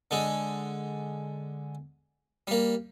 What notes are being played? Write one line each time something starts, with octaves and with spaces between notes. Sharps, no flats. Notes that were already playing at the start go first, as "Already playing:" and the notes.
D3 G#3
G3 A#3